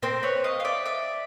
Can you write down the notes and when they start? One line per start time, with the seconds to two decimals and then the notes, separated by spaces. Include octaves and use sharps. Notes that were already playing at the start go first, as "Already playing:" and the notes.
0.02 C4 A#4 C5
0.23 B4 C#5
0.44 D#5 F5
0.60 F5
0.65 D5 E5
0.85 D5 E5